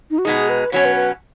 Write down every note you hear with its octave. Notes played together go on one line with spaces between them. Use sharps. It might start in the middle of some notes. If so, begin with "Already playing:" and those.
D#4
F#4
B2 G#3 D#4 G#4
B4
B2 F#3 C#4 C#5
B4
B4